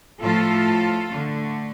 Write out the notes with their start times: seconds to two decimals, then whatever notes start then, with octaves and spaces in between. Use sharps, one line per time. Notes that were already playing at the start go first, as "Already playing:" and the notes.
0.21 A2 F3 A3 F4 A4
1.08 D3 A3